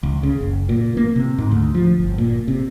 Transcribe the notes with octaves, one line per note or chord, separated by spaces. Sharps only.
C#2
C#3
F#1
A#2
A#3
C3
G#2
D2
F3
G1
A#2
C3